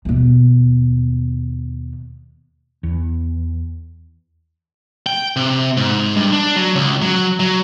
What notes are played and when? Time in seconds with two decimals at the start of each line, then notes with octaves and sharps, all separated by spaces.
0.05 D#2 B2
2.83 E2
5.06 G5
5.36 C3
5.77 G#2
6.16 G2
6.32 D4
6.56 F#3
6.75 C#2
7.02 F#3
7.40 F#3